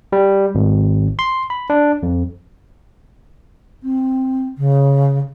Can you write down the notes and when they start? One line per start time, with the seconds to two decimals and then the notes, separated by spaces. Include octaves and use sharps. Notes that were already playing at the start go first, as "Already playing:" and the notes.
0.12 G3
0.55 G#1
1.19 C6
1.50 B5
1.70 D4
2.03 F2
3.82 C4
4.57 C#3